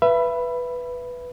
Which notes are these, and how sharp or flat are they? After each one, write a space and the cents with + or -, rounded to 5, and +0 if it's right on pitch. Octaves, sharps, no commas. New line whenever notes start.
B4 +0 E5 +30 B5 +0